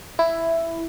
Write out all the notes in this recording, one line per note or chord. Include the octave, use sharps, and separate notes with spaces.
E4